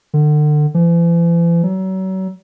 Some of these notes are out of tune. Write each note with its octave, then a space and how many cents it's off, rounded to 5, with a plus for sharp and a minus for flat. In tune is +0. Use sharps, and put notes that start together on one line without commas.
D3 +35
E3 +45
F#3 +35